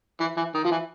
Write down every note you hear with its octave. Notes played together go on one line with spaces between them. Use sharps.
E3
E3
D#3
F3
E3